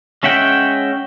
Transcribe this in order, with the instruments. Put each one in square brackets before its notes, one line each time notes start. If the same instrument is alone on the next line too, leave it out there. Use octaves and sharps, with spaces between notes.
[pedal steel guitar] G#3 C#4 E5 F#5 G5